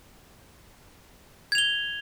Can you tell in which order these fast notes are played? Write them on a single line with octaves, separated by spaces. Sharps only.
G#6 F7 G7